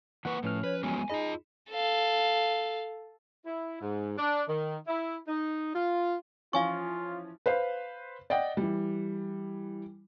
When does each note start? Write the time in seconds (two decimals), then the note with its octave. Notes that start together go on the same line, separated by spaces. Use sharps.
0.25 E3 A#3 B4 F#5 C#6
0.43 A2 F3 C#4 B4 F6
0.64 B4 C#5
0.83 F#3 G#3 B3 G#5
1.10 D#4 F4 G#4 D#5 B5
1.70 A4 F5
3.46 E4
3.81 G#2
4.18 D4
4.48 D#3
4.87 E4
5.28 D#4
5.75 F4
6.53 E3 F3 C#4 F4 F5 G#5 C#6
7.46 B4 C5 F5
8.30 D5 D#5 F#5 G5
8.57 E3 G3